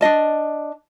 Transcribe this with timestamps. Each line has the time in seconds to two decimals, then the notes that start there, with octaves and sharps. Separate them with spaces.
0.01 D4 D#4 D#5 A5